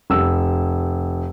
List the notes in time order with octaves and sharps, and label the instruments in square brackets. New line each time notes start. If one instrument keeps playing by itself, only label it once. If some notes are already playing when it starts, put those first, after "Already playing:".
[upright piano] F1 E6